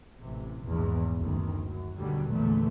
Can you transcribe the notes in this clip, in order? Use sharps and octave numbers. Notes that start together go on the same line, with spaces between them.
A1 C3 E3
A#1 E2 G#2
F#1 D2 D#3
F#2
D#2 B2 D3 F#3 G3
A#1 E2 A#2 D3 E3 A3